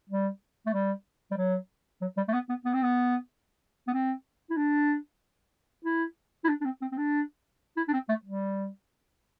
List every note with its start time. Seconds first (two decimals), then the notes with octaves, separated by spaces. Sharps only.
0.09 G3
0.66 A3
0.73 G3
1.31 G3
1.37 F#3
2.01 F#3
2.17 G3
2.28 A3
2.33 B3
2.49 B3
2.65 B3
2.74 C4
2.83 B3
3.88 B3
3.94 C4
4.50 E4
4.57 D4
5.85 E4
6.44 E4
6.49 D4
6.61 D4
6.65 C4
6.82 C4
6.92 C4
6.97 D4
7.77 E4
7.88 D4
7.93 C4
8.09 A3
8.25 G3